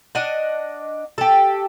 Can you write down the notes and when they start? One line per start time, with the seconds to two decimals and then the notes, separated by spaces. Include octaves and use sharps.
0.15 D4 D#5 F#5
1.18 G4 A4